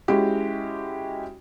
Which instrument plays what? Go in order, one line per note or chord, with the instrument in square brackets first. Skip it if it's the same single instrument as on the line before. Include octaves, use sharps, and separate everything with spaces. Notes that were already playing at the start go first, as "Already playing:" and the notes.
[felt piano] G#3 C#4 E4 F#4 G4